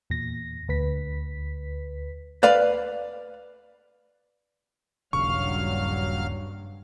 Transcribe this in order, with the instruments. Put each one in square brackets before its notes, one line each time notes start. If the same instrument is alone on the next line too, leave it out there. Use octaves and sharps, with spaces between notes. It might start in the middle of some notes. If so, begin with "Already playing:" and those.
[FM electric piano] E2 A#2 A#6
D2 B4 B6
[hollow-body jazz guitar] B4 D5 F5 B5
[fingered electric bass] D#1 A#1 C#3 [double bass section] G2 [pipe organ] F#3 F5 F6 [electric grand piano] C#6